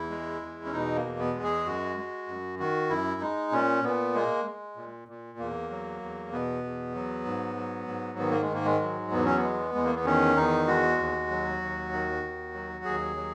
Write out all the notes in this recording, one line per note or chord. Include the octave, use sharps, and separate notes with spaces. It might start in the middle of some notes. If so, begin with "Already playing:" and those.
Already playing: E2 E4
G#3
E2
C#4
B2 D#4
A#3
E2
B3
G#3
G#4
F#2 F#4
G#3
F#2
D#3 F#4
F#2 E4
G#3 D#4
A#2 C#4
A#2 B3
G#3 A#3
G#3
A#2
A#2
E2 A#3
F#3
E2
B2 B3
E2
F#3
G#2
F#3
G#2
D#3 B3
A#3
G#3
G#2 A#3
G#3
F#3
E2 B3
C#4
B3
G#3
E2 G#3
A#3
B3
D#3 C#4
E2 D#4
G#3 F#4
D#2
F#3
D#2
D#3
D#2
F#3
D#2 G#4
F#3